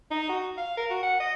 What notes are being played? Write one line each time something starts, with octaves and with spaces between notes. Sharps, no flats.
D#4
F#4
F5
A#4
F#4
F#5
D#5